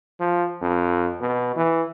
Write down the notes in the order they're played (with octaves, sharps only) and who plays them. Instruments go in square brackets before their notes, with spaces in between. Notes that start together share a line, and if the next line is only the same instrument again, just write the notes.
[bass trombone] F3
F2
B2
E3